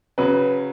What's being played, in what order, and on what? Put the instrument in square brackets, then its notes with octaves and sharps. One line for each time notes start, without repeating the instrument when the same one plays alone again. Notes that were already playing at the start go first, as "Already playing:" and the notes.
[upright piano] C#3 F#3 [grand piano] B4